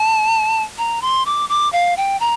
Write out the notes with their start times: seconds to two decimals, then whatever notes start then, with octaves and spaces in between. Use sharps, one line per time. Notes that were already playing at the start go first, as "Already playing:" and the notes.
Already playing: A5
0.78 A#5
1.02 C6
1.26 D6
1.49 D6
1.73 F5
1.97 G5
2.20 A#5